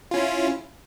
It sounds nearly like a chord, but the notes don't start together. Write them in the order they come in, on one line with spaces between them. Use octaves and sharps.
F4 C#4 E4